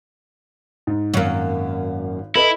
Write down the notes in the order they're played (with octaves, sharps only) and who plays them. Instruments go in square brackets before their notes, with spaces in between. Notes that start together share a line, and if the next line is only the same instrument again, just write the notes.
[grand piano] G#2
[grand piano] G#1 F5 [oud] F#2 A#3
[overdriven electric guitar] E4 [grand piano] A4 B4 D#5